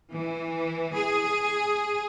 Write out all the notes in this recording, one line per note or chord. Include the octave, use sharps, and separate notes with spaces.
E3
G#4